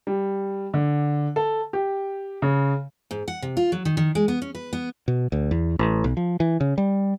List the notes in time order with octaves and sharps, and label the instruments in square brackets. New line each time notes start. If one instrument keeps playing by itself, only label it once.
[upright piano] G3
D3
A4
G4
C#3
[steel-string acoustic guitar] G#2
F#5
C3
F4
F#3
D#3
D#3
G#3
B3
C#4
B4
B3
[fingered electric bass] B2
D2
E2
A1
B1
F3
E3
C#3
G3